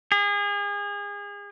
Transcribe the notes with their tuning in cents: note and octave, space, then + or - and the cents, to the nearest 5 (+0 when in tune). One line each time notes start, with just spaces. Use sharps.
G#4 -35